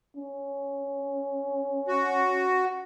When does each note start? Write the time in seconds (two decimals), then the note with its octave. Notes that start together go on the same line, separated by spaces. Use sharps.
0.16 C#4
1.88 F#4